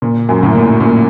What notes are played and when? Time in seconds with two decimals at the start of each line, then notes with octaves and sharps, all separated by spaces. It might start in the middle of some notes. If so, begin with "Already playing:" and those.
0.02 A#2
0.29 F#2
0.43 A2
0.55 A#2
0.80 A#2